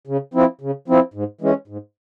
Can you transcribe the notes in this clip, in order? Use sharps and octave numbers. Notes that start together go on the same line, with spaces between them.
C#3
F3 C4 E4
C#3
F3 C4 E4
G#2
E3 G#3 C#4
G#2